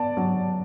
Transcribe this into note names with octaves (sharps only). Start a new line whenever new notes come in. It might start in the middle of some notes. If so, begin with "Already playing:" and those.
Already playing: B3 D5 A5
F#3